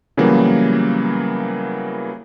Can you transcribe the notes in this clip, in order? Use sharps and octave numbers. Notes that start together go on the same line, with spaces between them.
C#3 E3 F#3 G3 A#3 B3